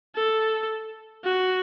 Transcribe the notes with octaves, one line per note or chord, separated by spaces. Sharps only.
A4
F#4